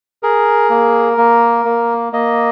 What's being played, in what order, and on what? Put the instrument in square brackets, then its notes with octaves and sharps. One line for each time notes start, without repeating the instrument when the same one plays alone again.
[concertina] G#4 A#4
A#3
A#3
A#3
A#3 D#5